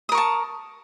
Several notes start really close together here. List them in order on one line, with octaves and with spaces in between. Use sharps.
D#6 A#4 C#6 A5